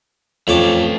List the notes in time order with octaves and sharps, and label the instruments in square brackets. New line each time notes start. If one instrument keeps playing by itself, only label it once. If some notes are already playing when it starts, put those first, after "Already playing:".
[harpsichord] F2 C#5 D6 [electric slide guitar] A3 C#4